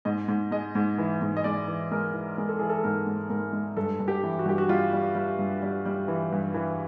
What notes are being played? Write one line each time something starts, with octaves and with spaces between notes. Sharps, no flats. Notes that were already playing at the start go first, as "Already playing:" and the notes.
G#2 D#5
G#2
G#3 D#5
G#2
E3
G#2
D#5
G#3 D5
E3
G#3 A#4
E3
G#3 A#4
A4
E3 G#4
A4
G#2 A#4
G#2
G#2 A#4
G#3
G2 A4
G2
G4
E3
F#4
G2 G4
F#4
G3 F4
G3
G3
G2
G3
G3
E3
G2
E3